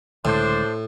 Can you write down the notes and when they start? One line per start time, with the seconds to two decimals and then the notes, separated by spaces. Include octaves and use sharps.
0.25 C#2 A2 D3 G#3 D4 C5